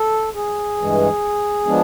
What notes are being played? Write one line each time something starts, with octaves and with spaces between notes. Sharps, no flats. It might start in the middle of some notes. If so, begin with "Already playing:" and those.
Already playing: A4
G#4
G2 E3 G#3
F3 G#3 B3 D4